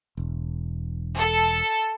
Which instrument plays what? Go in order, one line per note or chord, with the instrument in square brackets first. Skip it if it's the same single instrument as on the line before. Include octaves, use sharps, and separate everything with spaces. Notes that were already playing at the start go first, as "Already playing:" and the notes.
[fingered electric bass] E1
[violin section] A4